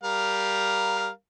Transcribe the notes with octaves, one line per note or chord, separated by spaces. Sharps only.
G3 A#4 F5